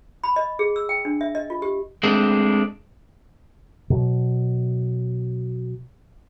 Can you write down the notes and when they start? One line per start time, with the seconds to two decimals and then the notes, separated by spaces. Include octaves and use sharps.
0.24 B5
0.36 D#5
0.59 G#4
0.76 E6
0.89 G5
1.05 D4
1.21 E5
1.35 D#5
1.50 F4
1.62 G4
2.03 G#3 A3 C4 D4
3.90 B2 F#3